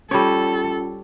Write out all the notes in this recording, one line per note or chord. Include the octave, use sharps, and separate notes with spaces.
G3 C#4 F4 A4 C#5